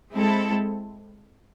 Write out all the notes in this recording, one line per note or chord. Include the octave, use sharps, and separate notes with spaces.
G#3 C4 E4 A4